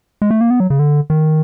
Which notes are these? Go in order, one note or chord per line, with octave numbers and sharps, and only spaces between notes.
G#3
A3
A#3
B3
F#3
C#3
D3
D#3